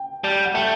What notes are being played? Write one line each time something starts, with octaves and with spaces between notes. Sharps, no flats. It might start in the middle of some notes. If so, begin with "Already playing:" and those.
Already playing: G5
G3 A5
F#5
A3 G5